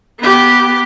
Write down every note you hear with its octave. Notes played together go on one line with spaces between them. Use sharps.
B3 G4